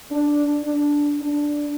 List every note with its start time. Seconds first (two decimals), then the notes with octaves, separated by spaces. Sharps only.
0.11 D4
0.64 D4
1.21 D4